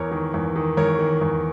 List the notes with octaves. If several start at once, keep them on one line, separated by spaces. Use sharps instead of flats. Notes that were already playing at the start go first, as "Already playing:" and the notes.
Already playing: E2 A#4 C#5
D#3
E2
D#3
E2 A#4 C#5
D#3
E2